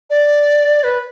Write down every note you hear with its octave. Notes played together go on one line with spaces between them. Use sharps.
D5
B4